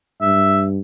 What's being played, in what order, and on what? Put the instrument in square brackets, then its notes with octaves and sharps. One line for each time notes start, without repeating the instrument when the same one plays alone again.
[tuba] G2 [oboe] E5